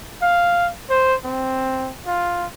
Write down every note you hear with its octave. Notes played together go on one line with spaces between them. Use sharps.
F5
C5
C4
F4